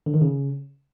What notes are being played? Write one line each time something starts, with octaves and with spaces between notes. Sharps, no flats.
D3
D#3
C#3